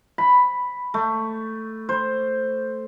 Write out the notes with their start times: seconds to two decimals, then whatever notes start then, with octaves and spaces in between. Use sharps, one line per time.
0.18 B5
0.94 A3
1.89 C5